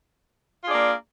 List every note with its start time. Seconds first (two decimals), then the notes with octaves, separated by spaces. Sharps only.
0.63 F4
0.66 G#4
0.69 D4
0.71 D5
0.74 A#3